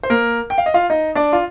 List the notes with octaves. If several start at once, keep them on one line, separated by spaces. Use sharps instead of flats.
C5
A#3 A#4
G5
F5
D#5
F4 F5
D#4 D#5
D4 D5
F4